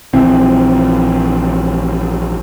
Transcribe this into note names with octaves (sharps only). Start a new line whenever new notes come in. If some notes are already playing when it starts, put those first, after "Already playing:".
A#1 E3 C4